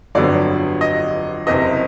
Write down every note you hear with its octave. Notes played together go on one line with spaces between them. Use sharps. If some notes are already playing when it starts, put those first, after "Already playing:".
G1 F2 D3 F#3 B3 D5
D#5
F#1 E2 C3 D#5